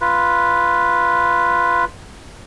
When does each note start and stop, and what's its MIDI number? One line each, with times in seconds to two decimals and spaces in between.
0.01 1.85 65
0.01 1.85 71